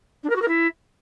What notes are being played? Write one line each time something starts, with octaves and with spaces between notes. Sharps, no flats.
D4
A#4
F#4
A#4
E4